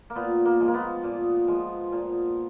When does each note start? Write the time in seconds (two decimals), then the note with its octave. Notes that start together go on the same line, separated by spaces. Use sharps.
0.10 A#3
0.15 A#2 B3
0.45 A#3
0.60 F3 G#3
0.68 A#3
0.74 B3
1.03 A#2
1.48 F3 G#3
1.92 A#2